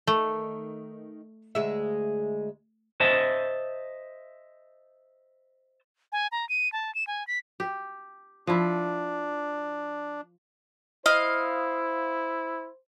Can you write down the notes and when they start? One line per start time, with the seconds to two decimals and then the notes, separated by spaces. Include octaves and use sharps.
0.07 D#3 A3
1.55 D2 G#3 E5
3.00 C5 D#5 E5 A5
6.12 G#5
6.32 A#5
6.49 D#7
6.73 A5
6.95 E7
7.07 G#5
7.27 B6
7.60 G4
8.47 F3 D4 E4
11.06 E4 C5 D#5 F5